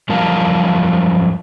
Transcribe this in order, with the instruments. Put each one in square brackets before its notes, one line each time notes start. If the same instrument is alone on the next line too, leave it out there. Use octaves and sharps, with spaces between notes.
[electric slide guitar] F#2 F3 G3 A#4 F5 A5